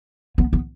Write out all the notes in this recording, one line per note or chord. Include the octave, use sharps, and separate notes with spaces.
B3
B3